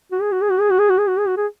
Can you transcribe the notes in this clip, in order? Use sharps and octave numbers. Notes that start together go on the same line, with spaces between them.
F#4
G#4
F#4
G#4
F#4
G#4
F#4
G#4
F#4
G#4
F#4
G#4
F#4
G#4